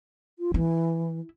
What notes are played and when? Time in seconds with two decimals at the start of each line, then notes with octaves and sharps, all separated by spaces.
0.39 F4
0.54 E3 E4